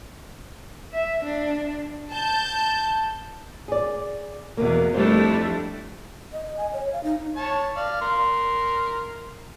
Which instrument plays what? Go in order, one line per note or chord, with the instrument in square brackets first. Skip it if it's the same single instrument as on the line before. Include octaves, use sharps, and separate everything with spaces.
[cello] E5
D4
[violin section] A5 G6
[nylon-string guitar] G#4 D5
[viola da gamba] E2 B2 [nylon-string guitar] A#3
[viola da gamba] F2 D4 E4 [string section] G3 A3 [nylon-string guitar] C5
[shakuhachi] D#5
D#5
G#5
C#5
F5
D#4
[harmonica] C#5 A5
D5 F5
A#4 C6